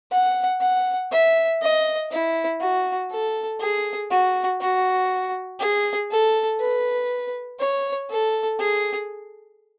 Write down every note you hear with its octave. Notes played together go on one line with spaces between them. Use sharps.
F#5
F#5
E5
D#5
E4
F#4
A4
G#4
F#4
F#4
G#4
A4
B4
C#5
A4
G#4